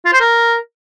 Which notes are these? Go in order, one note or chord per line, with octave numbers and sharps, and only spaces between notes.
F4
C5
A#4